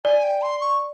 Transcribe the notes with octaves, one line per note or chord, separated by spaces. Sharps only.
D5 G#5
G5
C6
C#6